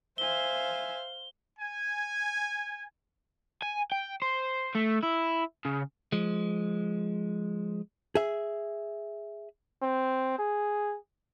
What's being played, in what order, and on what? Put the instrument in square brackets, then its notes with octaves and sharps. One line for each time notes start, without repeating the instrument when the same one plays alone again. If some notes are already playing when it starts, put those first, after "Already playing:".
[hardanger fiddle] C5 F5 [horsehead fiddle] E5 G#5 [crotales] G7
[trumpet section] G#5
[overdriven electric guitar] G#5
G5
C5
A3
E4
C#3
[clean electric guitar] F3 G#3
[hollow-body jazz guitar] G#4 E5
[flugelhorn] C4
G#4